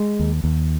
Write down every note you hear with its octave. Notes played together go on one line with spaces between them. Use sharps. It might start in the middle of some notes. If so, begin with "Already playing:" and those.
Already playing: G#3
D#2
D#2